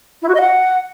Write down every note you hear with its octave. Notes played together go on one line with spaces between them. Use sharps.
E4
F#4
D#5
F#5